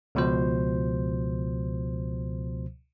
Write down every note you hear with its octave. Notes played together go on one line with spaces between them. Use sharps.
C#2 B2 F3 C5